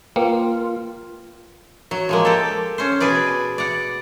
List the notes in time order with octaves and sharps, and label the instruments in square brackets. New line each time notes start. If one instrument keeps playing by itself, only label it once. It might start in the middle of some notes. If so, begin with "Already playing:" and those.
[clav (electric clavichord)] A#3 [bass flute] F4 [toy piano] B4 G5
[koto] F#3
F3 G#3 A#3
G4 A4
C#4 C5
B2 G#4 B4 D5
D5 F#5